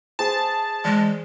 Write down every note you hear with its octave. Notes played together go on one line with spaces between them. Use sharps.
G#4 C5 A5
E3 G#3